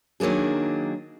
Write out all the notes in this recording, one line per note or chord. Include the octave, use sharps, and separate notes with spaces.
D#3 F#3 A#3 D4 G#4